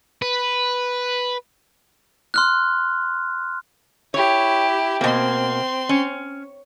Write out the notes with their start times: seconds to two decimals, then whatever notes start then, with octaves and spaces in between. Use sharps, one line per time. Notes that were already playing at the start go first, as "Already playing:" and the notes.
0.22 B4
2.34 C6 F6 F#6
4.14 E4 G4 C#5
5.01 B2 A#3 C4 C6
5.89 C#4